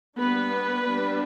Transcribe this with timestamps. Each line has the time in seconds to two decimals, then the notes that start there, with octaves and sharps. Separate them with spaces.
0.18 G3 A#3 B3 D4 B4
0.87 G3 B3 D4